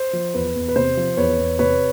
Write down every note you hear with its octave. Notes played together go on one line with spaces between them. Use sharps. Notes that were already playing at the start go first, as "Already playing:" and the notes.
Already playing: C5
F3
E2 B4
E2
B4
C3 C5
F3
E2 B4 C#5
E2
C3 B4 C#5